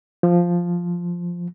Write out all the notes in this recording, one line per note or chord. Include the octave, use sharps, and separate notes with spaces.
F3